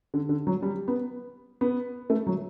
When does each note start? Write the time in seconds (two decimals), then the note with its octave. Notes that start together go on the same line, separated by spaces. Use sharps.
0.14 D3
0.29 D3
0.47 F#3
0.62 G3
0.88 B3
1.61 B3
2.10 A3
2.27 F#3